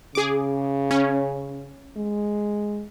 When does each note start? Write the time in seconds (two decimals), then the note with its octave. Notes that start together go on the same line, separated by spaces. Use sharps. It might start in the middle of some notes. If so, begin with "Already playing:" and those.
0.15 C#3 G#4 D6
0.91 C#4
1.97 G#3